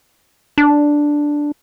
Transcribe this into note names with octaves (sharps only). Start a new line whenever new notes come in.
D4